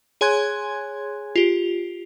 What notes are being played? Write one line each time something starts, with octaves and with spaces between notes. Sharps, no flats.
G#4 C#5 G#5 C6 F#6 G#6
F4 G4